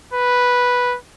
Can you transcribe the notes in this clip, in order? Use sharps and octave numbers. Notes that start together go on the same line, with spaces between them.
B4